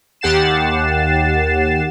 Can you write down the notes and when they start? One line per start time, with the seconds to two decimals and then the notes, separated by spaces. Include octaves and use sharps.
0.21 D#2 G4 F#5 A6 C7 E7